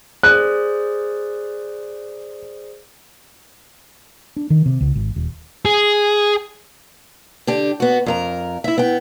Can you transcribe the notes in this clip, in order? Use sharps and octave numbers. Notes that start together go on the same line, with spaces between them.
G#4 C5 D5 F#6
D4
D#3
C3
C#2
G#1
D#1
G#4
D3 D4 G4
B3 F#4
F2 A#4 A#5
E4 E5
B3 G5